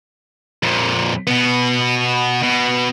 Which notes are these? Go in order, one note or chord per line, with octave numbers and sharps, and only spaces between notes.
F2 A#2
B2 B3
B2